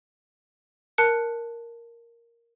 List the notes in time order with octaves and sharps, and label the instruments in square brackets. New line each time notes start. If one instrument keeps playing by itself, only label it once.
[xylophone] A#4 A5 F#6 C#7